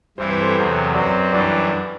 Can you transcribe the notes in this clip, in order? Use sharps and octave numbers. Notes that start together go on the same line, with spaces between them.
G2 E3 G3 C4 E4 C5
B4
A4 C5
E2 C3 F#3
F#2 F#3 C4 B4 D5
F#2 E3 G3 D4 B4 D5